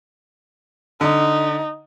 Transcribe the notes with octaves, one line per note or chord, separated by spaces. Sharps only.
D3 D#4